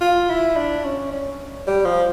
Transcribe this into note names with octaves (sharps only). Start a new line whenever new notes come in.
F4
E4
D4
C#4
C#4
G3
F3